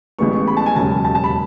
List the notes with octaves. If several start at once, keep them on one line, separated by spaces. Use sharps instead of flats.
A1 A2 G#3 B3 C#6
C#6
B5
A5
G#5
E1 D#2 C#3 F#3 C#4 A5
A5
A5
B5